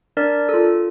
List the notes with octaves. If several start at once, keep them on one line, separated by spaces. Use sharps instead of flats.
D4 A#4 D5
F4 A4